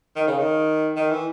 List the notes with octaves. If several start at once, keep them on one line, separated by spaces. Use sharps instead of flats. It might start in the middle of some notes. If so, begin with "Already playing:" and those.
D#3
C#3
D#3
D#3
E3